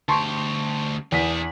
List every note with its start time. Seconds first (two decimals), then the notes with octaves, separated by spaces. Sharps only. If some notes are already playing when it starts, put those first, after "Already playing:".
0.09 D2 G4 A5 C6 C#6
1.12 E2 D4 G#4 B6